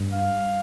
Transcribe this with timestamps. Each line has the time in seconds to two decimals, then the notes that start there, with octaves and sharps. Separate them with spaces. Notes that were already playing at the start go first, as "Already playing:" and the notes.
Already playing: G2
0.13 F5